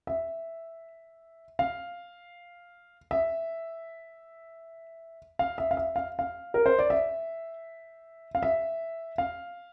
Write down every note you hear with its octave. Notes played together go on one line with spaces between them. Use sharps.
E5
F5
E5
F5
E5
F5
E5
F5
F5
A#4
C5
D5
E5
F5
E5
F5